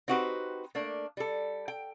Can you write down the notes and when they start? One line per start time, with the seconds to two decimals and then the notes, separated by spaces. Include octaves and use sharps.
0.08 C4 D#4 F#4 G4 B4 C5
0.75 A3 A#3 D4
1.17 G3 A4
1.68 G5